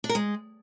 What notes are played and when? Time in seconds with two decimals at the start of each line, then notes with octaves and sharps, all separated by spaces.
0.04 D4
0.09 A#4
0.15 G#3